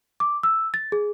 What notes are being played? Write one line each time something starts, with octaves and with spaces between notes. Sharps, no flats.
D6
E6
A6
G#4